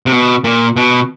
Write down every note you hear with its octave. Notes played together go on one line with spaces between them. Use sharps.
C3
B2
A#2
B2